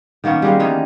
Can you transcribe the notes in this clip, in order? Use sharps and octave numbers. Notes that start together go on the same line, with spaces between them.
D#3 A#3 B3 C#4
G3 G#3 F5
D#3 E3 D#4